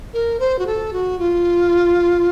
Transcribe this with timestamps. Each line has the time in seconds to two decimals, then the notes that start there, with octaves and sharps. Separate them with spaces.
0.14 A#4
0.40 C5
0.59 F#4
0.67 A4
0.93 F#4
1.19 F4